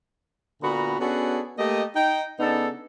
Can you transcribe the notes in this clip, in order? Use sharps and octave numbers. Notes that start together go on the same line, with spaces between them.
A#2 D3 B3 F#4 A#5 B5
B3 C#4 D4 F#4 G#4 A4
A3 A#3 G4 D#5
D#4 G5
C#3 B3 D4 D#4 A4